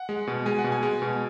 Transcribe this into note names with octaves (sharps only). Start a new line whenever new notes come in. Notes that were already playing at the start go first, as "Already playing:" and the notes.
Already playing: F#5
G#3
B2
G#3 G#5
F#5
B2
G#5
G#3
B2